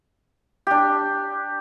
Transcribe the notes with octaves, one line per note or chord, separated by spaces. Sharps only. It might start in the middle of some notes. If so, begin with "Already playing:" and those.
D4 G4